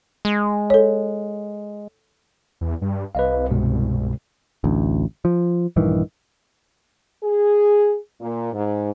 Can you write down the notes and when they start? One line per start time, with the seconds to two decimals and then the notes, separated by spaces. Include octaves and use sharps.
0.25 G#3
0.70 A4 C#5
2.61 E2
2.82 G2
3.15 C2 B4 D#5 F5
3.50 G2 B2 G#3
4.64 A1 D2
5.25 F3
5.76 A#1 G2 D#3 E3
7.23 G#4
8.20 A#2
8.53 G#2